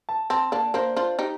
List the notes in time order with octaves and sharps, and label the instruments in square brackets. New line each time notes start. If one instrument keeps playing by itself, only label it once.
[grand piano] A5
[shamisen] C4 [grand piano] A5
[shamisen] A#3 D4 [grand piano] A5
[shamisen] A#3 D4 [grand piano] C5
[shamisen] D4 F4 [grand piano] C5
[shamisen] D#4 G4